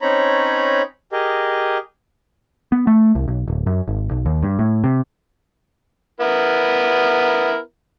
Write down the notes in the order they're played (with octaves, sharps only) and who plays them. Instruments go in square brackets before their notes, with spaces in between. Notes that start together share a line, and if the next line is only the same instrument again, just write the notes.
[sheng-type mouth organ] C4 C#4 D#4 C#5 A#5 B5
G4 G#4 A#4 D#5
[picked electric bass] B3
A3
C2
B1
D1
F#2
G#1
B1
D#2
G2
A2
C3
[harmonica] B3 E4 A#4